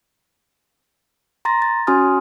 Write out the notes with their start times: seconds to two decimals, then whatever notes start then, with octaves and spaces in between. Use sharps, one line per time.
1.45 A#5 C6 A6 A#6
1.62 A6
1.87 C#4 F#4 G#5 C6 D#6 F6